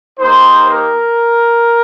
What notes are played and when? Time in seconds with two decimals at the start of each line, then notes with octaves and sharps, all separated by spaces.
0.19 A#3 D#4 G4 C5
0.71 A#4